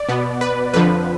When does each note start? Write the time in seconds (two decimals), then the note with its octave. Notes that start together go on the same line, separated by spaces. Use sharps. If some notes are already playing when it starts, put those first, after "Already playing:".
Already playing: D5
0.09 B2 B3
0.41 B4
0.73 F2 D3 F3 B4